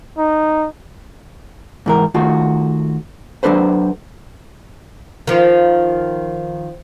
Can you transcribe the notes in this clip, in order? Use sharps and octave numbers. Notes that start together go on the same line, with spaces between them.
D#4
G#2 E3 A#4
D#3 A3 F4 F#4
F#3 A3 D4 A4 B4 C5
D#3 F3